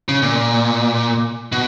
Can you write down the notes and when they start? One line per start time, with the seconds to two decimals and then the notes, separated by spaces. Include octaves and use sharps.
0.09 C#3
0.22 A#2
1.52 B2